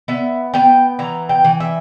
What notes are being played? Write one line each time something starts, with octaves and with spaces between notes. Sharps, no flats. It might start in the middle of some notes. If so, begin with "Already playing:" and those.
B3 E5
B3 G5
E3 A#5
G5
E3
E5